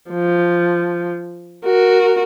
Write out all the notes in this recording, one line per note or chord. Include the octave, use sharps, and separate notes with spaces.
F3
F#4 A#4